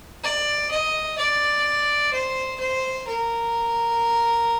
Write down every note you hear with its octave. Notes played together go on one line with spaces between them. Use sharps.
D5
D#5
D5
C5
C5
A#4